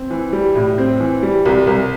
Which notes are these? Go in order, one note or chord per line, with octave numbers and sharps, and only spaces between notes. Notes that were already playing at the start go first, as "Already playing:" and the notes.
Already playing: C4
E3
G3
A2
C4
E3
G3
C2
C2